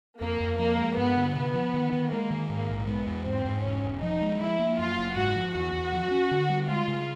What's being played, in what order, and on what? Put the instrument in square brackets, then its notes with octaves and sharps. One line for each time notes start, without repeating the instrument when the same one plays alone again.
[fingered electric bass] F2 [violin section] A#3
[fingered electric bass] F2
[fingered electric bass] F3 [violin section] A#3
[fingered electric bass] G#3
[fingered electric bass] G2 [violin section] B3
[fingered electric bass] D3
[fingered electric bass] C3 [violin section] B3
[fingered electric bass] F3
D#3
D#3
[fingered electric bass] G#3 [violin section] A#3
[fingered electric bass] D#3
[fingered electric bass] G#2 [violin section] A#3
[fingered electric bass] A#1
[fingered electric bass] G#3 [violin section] B3
[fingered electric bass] E2
[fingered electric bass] G#2 [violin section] C4
[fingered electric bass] G#2
[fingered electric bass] E1 [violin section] C#4
[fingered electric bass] E1
[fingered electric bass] F3 [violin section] D#4
[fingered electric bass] G#3
[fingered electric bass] F3 [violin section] E4
[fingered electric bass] A#3
[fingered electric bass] F#2 [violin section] F4
[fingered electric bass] F#1
[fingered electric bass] G#2 [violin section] F#4
[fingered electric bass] F3
[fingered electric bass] E2 [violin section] F#4
[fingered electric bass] E2
F3
C#4
D3
G3
[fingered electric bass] G#3 [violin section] F4
[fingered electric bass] C#3